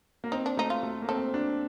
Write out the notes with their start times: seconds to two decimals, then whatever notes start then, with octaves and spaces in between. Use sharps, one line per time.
0.24 A#3
0.32 C4 D#4
0.46 D4
0.57 A3 D#4
0.70 F4
0.83 A3
1.02 A#3
1.09 C4 A4
1.34 D4